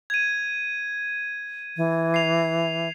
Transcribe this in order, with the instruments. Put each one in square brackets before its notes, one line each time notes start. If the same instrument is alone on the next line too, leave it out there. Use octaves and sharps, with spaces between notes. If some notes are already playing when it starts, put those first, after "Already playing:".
[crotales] G#6 D#7
[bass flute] E3
[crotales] C7 F7